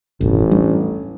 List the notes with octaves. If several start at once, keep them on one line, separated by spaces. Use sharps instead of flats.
D#1 A1 G2 B2
G3 D4